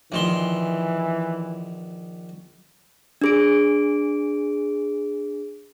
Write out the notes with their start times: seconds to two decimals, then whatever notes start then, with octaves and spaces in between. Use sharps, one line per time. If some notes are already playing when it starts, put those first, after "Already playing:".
0.12 A#1 D#3 E3 C6
3.22 D4 G#4 D7